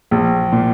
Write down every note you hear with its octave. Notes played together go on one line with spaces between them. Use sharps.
A#1
A#2